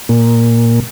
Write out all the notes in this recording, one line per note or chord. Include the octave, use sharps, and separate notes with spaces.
A#2 A#3